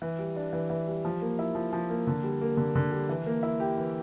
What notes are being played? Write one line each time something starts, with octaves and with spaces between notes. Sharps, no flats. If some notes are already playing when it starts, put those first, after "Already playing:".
E3
G3
D4
E3
E3
G3
F3
A#3
E4
F3
F3
A#3
D3
G3
A#3
D3
D3
G3
E3
A#3
E4
G4
E3